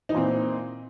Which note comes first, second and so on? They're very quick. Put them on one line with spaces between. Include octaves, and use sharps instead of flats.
D#4 E3 A#2 C4